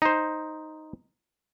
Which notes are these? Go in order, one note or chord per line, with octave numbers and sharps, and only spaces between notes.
D#4 C5